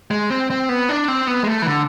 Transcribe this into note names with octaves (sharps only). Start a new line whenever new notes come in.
G#3
C4
C4
B3
D4
C4
B3
G#3
A3
E3
D3